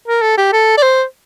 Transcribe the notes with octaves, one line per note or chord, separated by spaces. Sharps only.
A#4
A4
G4
A4
D5
C5